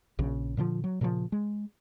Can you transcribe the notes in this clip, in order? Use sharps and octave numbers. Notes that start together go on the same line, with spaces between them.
A#1 C#3
A#2 D3 E3 F3
F#3
A#2 C#3 E3 F3
G#3